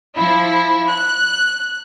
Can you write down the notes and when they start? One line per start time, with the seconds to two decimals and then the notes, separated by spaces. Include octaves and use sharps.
0.16 F3 E4
0.89 F#6